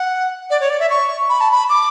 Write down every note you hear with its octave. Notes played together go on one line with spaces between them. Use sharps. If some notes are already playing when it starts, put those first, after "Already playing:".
Already playing: F#5
D5
C#5
D5
E5
C#6
B5
A5
B5
D6